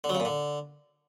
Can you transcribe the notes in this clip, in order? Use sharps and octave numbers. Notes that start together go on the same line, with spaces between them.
D3
F#3
C#3
A#2
D3